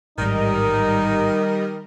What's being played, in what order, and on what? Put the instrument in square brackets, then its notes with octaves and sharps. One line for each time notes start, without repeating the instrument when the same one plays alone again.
[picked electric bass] A1 G#2 [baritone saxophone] D#3 [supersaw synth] G3 A#4 D#5 [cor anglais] D#4